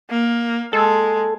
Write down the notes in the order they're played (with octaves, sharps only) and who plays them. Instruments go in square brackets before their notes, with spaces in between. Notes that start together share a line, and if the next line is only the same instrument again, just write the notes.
[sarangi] A#3
[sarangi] G#3 [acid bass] A4